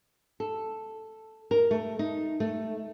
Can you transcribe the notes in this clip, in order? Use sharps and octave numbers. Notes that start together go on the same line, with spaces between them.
A4
A#4
A3
D#4
A3